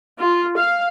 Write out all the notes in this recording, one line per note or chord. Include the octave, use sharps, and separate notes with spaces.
F4
F5